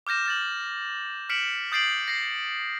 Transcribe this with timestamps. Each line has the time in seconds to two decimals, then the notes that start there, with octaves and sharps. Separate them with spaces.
0.07 D6 F6 G6 A#6 E7
0.26 F6 A6 F#7
1.29 F6 B6 C#7 D7 E7 F#7
1.72 D#6 G6 A6 C7 D7 F#7
2.08 A#6 C7